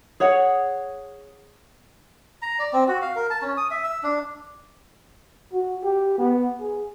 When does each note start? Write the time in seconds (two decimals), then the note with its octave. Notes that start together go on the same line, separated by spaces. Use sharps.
0.20 G#4 C#5 F#5
2.42 A#5
2.59 D5
2.73 C4
2.88 F#4
3.02 F5
3.16 A#4
3.30 A5
3.42 C#4
3.57 D#6
3.71 E5
3.84 E6
4.03 D4
5.53 F#4
5.84 G4
6.18 B3
6.60 G#4